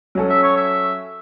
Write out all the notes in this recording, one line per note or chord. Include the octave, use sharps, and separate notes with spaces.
F#3 C#4 A4
E5
C#5
E5